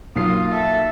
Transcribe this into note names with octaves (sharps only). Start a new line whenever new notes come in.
B1 A#3 F4 D#6 C7
A4 E5